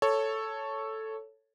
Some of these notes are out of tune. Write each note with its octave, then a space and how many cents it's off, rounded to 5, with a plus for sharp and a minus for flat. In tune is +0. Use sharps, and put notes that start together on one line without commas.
A4 +0 C#5 +0